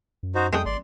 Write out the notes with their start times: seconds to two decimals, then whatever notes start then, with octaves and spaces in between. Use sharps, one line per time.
0.23 F#2
0.35 D#4 F#4 C5
0.53 F2 G#3 A3 D4 G5 D#6
0.66 G#1 D5 C6